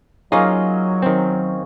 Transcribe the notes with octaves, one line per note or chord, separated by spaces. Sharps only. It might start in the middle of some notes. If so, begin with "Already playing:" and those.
F#3 A#3 C#4 D#4 F4 G#4 D#5
D#3 C4